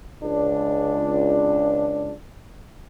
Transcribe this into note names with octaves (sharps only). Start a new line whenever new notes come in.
C#2 D4